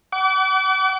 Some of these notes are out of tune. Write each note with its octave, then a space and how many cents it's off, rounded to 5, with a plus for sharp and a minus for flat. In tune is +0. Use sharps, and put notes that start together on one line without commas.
F#5 +35 D6 -35